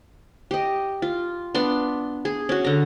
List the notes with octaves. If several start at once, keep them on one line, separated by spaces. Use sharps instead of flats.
G4 D#5
F4
B3 D4 C6
G#4
C#4 F#4
D3 A#5